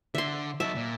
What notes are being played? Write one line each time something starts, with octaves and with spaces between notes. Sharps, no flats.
D3 E5 C6
F#3 D#4 E5 A5
A#2